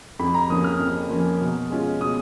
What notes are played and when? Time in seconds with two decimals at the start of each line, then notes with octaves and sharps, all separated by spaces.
0.19 F2 B5
0.34 A#5
0.50 F3 A#3 C#4 D#6
0.64 F6
0.80 F2
1.10 F3 A#3 C#4
1.41 B2
1.70 G#3 C#4 F4
2.00 B2 D#6